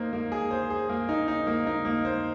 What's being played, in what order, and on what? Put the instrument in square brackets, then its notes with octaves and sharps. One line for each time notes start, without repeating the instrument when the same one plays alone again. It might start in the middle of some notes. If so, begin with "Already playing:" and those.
Already playing: [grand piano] A#3 D#4 C5
A#3
G#4
C5
G#4
A#3
D#4
D#4
A#3
D#4
A#3
C5